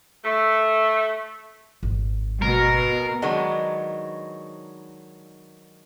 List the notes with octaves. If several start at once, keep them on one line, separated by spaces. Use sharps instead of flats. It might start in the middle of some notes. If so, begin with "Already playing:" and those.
A3
G#1 D2
B2 A#4
D#3 F#3 G#3 B3 D4 D#4